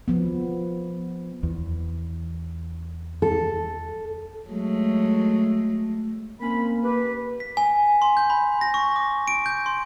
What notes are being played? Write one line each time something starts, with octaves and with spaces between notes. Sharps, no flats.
F3 B3
E2
A4
F#3 G#3 A3
A#3 C4 C#4 B5
G4 B4
B6
G#5
C6
G6
B5
A#6
C#6
D6
D7
G6
C6